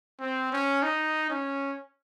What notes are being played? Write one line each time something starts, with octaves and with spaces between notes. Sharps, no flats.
C4
C#4
D#4
C#4